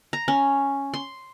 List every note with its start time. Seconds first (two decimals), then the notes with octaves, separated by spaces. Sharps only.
0.13 A#5
0.28 C#4
0.94 C6